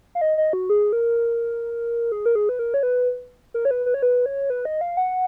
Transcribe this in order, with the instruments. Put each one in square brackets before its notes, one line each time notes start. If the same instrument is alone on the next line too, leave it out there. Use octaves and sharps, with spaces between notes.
[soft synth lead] F5
D#5
D#5
F#4
G#4
A#4
G#4
A#4
G#4
B4
A#4
C#5
B4
A#4
C#5
B4
B4
C#5
B4
C#5
B4
D#5
F5
F#5